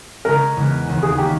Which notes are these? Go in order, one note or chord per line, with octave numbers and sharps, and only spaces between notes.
C#3 G#3 C#4 A#4
E2 C#3 G#3 B3
E1 D#2 C#3
G#4
D#3 A#3 C#4 G4